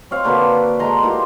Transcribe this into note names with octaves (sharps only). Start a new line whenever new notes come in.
C4 C#5 F5
D3 A#3 F#4 B4
G#3 A4 A#5 C6
A#3 E4 F4 G4